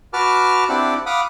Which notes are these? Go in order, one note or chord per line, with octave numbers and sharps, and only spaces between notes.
F#4 B4 A5 D6 F6
C4 D4 E4 G4 D5 F#5
F5 F#5 B5 D6 D#6